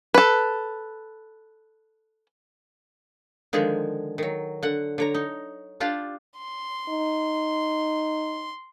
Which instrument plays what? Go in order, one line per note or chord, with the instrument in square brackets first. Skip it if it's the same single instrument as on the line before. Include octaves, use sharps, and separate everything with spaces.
[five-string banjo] A4 B4
[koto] D3 D#3 F3 G#3 G#4
D#3 F#3
D3 F#5
D3 C#5 A#5
D#4
D4 F4 G4 A5
[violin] C6
[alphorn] D#4